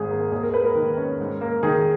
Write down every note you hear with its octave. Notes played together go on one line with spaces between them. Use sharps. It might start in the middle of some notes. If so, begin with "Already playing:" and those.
Already playing: G#1 G#2 D#3 G#4
A#3
D#2 G#4
A#4
A#3 B4
A#4
D#3
C#4
G#2
A#3
D#3 G#4